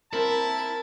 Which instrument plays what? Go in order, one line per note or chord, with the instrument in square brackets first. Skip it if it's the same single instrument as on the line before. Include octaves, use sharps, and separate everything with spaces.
[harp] C4 A#4 [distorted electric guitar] E4 [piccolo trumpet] A5